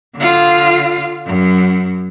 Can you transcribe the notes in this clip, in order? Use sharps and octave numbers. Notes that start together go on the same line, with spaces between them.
D3 F4
F#2